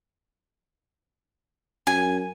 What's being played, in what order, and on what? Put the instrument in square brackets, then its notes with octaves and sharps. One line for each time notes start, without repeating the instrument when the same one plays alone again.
[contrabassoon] F#2 [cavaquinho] G#5